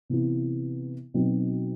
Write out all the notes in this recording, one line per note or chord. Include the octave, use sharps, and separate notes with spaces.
C3 E3 B3 E4
B2 F#3 C4 D#4